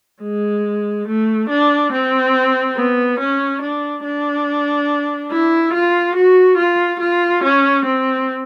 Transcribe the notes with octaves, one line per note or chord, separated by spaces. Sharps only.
G#3
A3
D4
C4
B3
C#4
D4
D4
E4
F4
F#4
F4
F4
C#4
C4